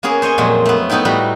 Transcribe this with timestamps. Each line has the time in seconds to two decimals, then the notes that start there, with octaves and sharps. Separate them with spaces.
0.03 A#3 B3 C#4 G#4 A#4
0.22 C5 C#5 D#5 G#5
0.38 F2 A#2 F#3 G#3
0.65 A3 B3
0.90 A3 B3 D#4 E4 G5
1.05 A2 G3 F#4 A#5 B5